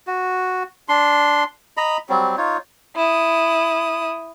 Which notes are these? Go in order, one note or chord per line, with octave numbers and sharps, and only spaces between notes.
F#4
D4 C6
D#5 A#5 B5
F#3 G3 C4
D#4 F4 C#5
E4 D#6